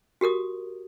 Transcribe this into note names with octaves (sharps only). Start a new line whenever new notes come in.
F#4 G4 A#4 D#6